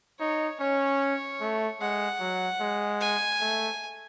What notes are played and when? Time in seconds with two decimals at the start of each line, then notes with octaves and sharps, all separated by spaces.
0.20 D#4 C#5
0.60 C#4 C#5
1.41 A3
1.81 G#3 F#5
2.21 F#3
2.61 G#3
3.01 G#5
3.41 A3